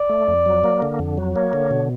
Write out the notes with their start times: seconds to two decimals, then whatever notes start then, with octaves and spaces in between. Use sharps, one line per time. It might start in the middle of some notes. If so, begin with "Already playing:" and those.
Already playing: D5
0.10 A3
0.28 F2
0.46 F#3
0.64 A#3
0.82 D3
0.99 F2
1.17 F#3
1.35 A#3 C#5
1.53 D3
1.71 B2